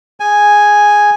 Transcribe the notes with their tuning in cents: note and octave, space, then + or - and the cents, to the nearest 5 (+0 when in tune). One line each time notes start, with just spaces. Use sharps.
G#4 -10 G#5 +0